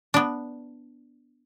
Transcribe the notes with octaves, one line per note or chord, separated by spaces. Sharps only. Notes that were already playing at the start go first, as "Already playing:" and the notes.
B3 D4